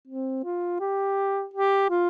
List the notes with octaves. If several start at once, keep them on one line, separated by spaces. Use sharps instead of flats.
C4
F4
G4
G4
F4